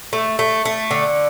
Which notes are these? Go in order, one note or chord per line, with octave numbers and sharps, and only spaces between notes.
A3
A3
A3
D3